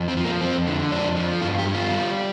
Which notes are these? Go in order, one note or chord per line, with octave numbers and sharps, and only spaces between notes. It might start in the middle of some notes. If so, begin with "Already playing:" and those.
Already playing: F2
C4
F3
A#3
F2 C4
D3
F2 D4
F3
G2 F4
G4
G3
F4
G3